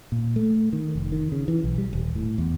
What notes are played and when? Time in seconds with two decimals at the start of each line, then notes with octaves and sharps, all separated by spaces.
0.12 A#2
0.36 A3
0.73 D#3
0.95 F1
1.12 D#3
1.32 C#3
1.48 E3
1.64 B1
1.78 G3
1.93 D#1
2.15 A2
2.38 E2